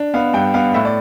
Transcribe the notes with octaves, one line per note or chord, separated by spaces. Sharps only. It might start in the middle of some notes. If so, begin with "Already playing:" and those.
Already playing: D4
B3 F5
G2 G5
B3 F5
A2 E5
D5